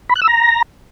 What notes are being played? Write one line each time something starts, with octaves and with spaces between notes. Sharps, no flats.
B5
F#6
E6
A#5